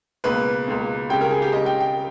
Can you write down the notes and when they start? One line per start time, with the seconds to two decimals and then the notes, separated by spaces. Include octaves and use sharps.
0.24 C#2 B2 A#3 B4
0.67 C#2 B2 A#3
1.09 C#2 C#3 G3 G5
1.21 A#4
1.31 G#4
1.42 G4
1.52 C#2 C#3 G3 D#5
1.66 G5
1.81 G5